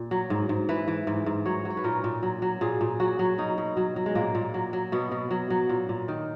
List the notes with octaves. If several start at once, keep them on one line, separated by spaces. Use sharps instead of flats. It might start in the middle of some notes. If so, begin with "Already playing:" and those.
Already playing: A#2
F#3
G#2
G#2
E3 B4
E3
G#2
G#2
F#3 C#5
F#3
C#5
B4
A#2 A#4
A#2
F#3
F#3
A#2 G#4
A#2
F#3 F#4
F#3
B2 D#4
B2
F#3
F#3
G#3
A#2 A#3
A#2
F#3
F#3
B2 B3
B2
F#3
F#3
A#2
A#2
D#3